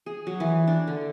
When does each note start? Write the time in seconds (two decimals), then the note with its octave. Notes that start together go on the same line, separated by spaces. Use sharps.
0.06 G#4
0.27 F#3
0.40 E3
0.67 D4
0.87 D3